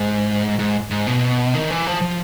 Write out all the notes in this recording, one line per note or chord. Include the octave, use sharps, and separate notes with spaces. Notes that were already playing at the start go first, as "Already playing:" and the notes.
Already playing: G#2
G#2
G#2
B2
D#3
E3
F3
F3